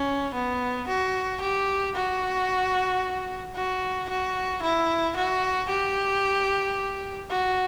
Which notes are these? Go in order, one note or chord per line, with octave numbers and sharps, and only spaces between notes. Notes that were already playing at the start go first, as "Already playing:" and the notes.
Already playing: C#4
B3
F#4
G4
F#4
F#4
F#4
E4
F#4
G4
F#4